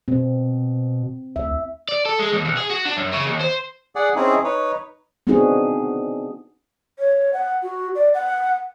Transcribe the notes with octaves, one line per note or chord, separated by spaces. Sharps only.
B2 C4
D2 E5
D5
A4
G#3
D#2
B1
G#4
F#4
D4
F#2
C#3
D#2
C5
G#4 D5 F#5
C4 C#4 D#4 E4 G#4
D#4 B4 C#5
B3 C4 D4 D#4 F#4 G#4
C#5
F#5
F#4
D5
F#5